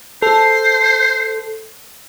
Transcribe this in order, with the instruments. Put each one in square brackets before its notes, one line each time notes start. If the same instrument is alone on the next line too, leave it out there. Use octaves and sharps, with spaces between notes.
[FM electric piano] A4 [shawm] C5